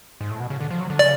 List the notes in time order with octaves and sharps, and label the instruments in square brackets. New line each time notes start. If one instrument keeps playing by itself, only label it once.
[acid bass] G#2
A2
B2
C#3
D3
F3
F#3
D3
[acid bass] C#3 [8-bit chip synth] D5